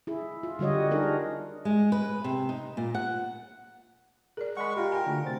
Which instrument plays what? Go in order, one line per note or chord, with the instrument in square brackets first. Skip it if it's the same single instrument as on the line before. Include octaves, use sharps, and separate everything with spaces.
[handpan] E4 G#4
F4
D3 G3 F#4 C#5 D#5
D4 D#4 G#4 A#4
[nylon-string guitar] G#3
B4
C3
D#4
A#2
F#5
[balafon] G#4 D5 [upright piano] A#4
[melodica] G#3 C#6 [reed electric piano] F#5 B5
[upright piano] F4 G4 [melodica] A#4
[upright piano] G5 [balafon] G#5
[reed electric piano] D3 A3 F#4
C3 C4 A6